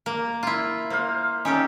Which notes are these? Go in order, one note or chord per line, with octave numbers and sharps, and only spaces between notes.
A#3
E4 F4
A#3 C5 F5
C#4 D#4 G4 A4